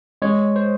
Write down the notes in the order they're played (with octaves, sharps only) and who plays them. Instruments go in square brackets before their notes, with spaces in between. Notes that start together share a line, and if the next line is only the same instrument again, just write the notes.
[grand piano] G#3 [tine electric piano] C#5
[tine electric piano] C5